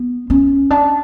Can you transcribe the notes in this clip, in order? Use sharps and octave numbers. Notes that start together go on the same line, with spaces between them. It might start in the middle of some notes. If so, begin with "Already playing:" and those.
Already playing: B3
C#4
D4